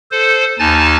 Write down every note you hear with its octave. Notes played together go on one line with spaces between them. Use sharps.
A4 C5
D#2 D#4 G#5 A5 A6